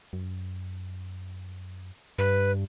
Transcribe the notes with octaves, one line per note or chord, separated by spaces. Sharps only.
F#2
G2 B4